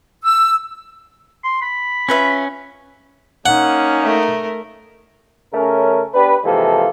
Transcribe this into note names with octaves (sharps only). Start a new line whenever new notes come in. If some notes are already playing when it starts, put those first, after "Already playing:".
E6
C6
B5
C#4 F4 B4 E5
A#3 C#4 D#4 F#5
A3 A#4
C#3 A3 C#4 A#4
B3 D4 G4 B4
C3 E3 F3 G#3 A#3 A4